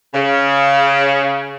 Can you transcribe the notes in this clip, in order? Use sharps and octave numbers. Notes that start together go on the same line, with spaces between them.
C#3